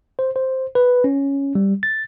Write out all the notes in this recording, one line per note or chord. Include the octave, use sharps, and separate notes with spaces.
C5
C5
B4
C#4
G3
A6